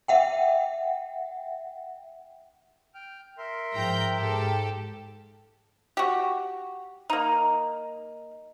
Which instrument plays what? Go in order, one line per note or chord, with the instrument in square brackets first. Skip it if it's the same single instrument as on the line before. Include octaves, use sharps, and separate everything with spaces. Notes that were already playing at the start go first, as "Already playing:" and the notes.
[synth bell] E5 F#5 G5
[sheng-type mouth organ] G5 F6
A#4 E5 C6
[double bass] G#2 F3 [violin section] G5 A#5 G6
[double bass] G#2 [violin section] G4 A4
[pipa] F#4 G4
A#3 D#4